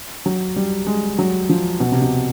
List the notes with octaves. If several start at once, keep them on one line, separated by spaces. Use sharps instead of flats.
F#3
G3
G#3
F#3
F3
B2
C3
B2